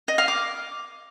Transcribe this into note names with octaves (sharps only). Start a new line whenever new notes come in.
D#5
F5
D6